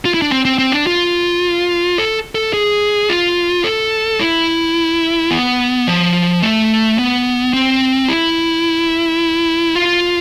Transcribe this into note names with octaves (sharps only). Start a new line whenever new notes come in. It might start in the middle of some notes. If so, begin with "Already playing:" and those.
F4
E4
D4
C4
C4
C4
D4
F4
A4
A4
G#4
F4
A4
E4
B3
F3
A3
B3
C4
E4
F4